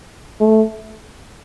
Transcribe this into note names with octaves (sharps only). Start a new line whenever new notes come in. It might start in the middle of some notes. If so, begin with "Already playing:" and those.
A3